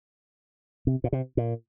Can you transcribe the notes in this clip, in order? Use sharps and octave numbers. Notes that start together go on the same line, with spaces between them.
C3
A#2
C3
A#2